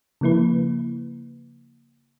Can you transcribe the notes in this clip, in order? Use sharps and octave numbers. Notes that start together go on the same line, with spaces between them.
C#3 F3 A#3 E4 B4